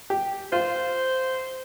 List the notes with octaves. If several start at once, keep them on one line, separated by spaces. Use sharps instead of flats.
G4
F4 C5